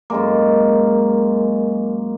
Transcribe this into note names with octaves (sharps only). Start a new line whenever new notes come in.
F#2 G#3 A#3